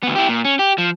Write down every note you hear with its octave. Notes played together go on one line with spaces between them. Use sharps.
D2 B3
E4 G4
A#2
C#4
G4
F3